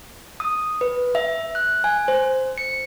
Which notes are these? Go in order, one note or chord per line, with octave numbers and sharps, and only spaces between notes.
D#6
B4
E5
F#6
G#5
C5
C#7